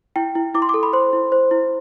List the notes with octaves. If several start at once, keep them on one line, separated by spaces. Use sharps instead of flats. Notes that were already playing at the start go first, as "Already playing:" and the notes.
E4 G5
E4
E4 D6
C6
A4 D6
B5
C5 C6
E4
C5
E4